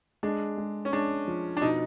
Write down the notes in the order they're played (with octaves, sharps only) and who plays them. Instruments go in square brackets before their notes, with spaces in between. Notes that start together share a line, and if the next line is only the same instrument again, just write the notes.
[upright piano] G#3 [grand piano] D4
[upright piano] G#3
[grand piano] C#4
[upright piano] G#3 [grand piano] D4
[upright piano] F3
[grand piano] D4
[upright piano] B2 [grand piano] D#4